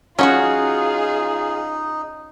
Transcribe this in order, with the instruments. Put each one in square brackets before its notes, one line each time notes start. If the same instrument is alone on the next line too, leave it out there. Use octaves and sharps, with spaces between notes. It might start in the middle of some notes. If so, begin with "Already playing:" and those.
[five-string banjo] F#3 F#5 [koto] C#4 F#4 [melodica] D#4 [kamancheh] F4 G#4